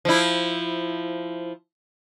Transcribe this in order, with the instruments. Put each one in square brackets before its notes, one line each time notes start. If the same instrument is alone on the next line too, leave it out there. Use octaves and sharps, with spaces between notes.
[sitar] F3 E4